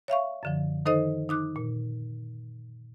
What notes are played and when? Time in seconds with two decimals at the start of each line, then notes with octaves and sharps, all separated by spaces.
0.08 C#5 E5 F5 C#6
0.43 F#2 D3 F3
0.86 D#3 D#4 A4 C5 D#5 D#6
1.29 D#4 D6 F#6
1.56 A#2